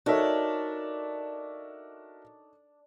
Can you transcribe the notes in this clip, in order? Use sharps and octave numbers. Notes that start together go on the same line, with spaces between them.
D4 D#4 F#4 A4 A#4 C#5 E5